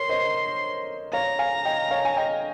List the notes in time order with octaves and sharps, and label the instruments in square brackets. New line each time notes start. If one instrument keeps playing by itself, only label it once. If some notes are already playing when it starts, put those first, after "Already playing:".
Already playing: [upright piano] A#4 C#5 [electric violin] C6
[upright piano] C5 D#5
[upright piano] C#5 F5 [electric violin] A#5
[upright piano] F5 G#5
D#5 G5
C#5 F5
G#5
D#5 G5